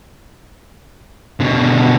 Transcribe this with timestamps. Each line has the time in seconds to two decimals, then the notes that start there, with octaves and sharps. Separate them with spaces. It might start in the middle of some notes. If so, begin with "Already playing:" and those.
1.40 B2 D3